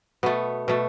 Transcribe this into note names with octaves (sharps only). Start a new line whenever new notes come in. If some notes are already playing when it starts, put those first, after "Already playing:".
B2 A3 B3
B2 A3